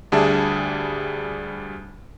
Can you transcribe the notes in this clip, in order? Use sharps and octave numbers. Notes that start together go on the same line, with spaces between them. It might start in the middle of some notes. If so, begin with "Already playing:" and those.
D2 G3 D4 G#4 E5 A5